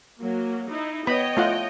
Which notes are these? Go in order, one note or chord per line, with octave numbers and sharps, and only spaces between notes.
F#3 A#3
D#4 E4
B3 C#5 D#5 G5 B5
A3 F4 F#5